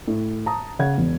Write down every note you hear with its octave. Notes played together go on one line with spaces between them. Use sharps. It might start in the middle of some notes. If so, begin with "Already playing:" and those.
A2
A5 A#5 D#6
C#3 C#5 F#5 G#6
E1